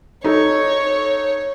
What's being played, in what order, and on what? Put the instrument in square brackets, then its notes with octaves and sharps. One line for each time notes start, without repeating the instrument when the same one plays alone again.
[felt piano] D#4 A4 [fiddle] C#5